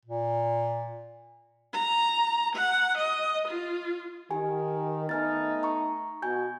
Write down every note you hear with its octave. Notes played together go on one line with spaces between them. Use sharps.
A#2
A#5
F#5
D#5
F4
D#3 G4 G#5
A3 B3 D#4 G#5 F6 A6
A#5 C#6
B2 F#4 G#5 G6